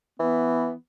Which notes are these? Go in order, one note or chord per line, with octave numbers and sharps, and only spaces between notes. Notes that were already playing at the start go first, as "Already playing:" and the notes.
E3 B3